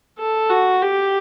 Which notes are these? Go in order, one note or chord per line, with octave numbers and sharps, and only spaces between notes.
A4
F#4
G4